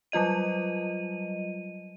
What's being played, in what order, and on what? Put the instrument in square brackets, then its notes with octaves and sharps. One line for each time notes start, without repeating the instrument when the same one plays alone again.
[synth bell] F#3 G3 F4 D#5 D#7